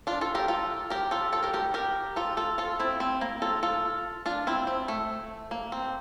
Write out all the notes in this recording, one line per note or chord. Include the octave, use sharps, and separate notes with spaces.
D4 F4
F4 A4
G4 A#4
F4 A4
G4 A#4
F4 A4
F4 A4
G4 A#4
G4 A#4
G4 A#4
F4 A4
F4 A4
F4 A4
C4 E4
C4
A#3
F4 A4
F4 A4
D4 F4
C4 E4
C4
A3
A#3
C4